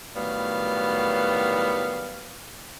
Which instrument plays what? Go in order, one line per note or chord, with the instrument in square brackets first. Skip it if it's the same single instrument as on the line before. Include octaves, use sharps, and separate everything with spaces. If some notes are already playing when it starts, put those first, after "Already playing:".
[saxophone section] A2 D#3 F#3 G3 B3 F5